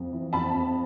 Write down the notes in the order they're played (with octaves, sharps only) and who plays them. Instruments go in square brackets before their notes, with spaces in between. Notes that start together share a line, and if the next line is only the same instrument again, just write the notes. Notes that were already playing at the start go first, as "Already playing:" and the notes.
Already playing: [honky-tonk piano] F2
E3
F2 A5 B5
F2